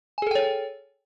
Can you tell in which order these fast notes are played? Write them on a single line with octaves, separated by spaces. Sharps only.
G#5 G#4 A4 G5 C#5